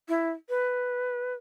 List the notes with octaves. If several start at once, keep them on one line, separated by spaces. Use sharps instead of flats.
E4
B4